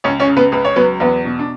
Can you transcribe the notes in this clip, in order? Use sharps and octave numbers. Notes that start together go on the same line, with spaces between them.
C#2 C#4 C#5
C#4 C#5
C#3
B3 B4
C#2 B4
C#5
F#3 B3 B4
E2 B3 B4
B2
D4